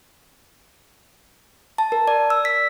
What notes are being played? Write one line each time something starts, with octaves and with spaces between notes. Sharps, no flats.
A5
A#4
D5
E6
B6